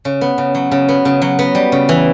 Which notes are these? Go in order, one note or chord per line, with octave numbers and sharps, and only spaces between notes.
C#3
B3
C#3
F#3
C#3
B3
C#3
F#3
B3
G3
C#3
E3